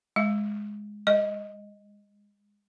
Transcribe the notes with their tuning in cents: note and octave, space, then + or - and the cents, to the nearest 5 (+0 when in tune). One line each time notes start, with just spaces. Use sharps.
G#3 +0 F5 -15
G#3 -30 D#5 +0